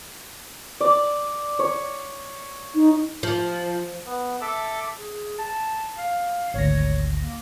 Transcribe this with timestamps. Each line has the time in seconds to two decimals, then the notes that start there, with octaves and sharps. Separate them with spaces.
0.81 D5
1.59 C#5
2.75 D#4
3.23 F3
4.06 B3
4.41 A4 E5 A5 D6 E6
4.97 G#4
5.38 A5
5.98 F5
6.54 G#1 D2 C#5 A#6
7.22 A#3